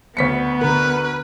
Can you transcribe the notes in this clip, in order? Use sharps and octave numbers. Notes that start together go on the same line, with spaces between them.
D2 B3 B6 C#7
D3 A#4 B4